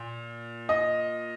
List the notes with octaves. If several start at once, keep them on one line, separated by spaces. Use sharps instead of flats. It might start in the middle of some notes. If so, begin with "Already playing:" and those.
Already playing: A#2
D#5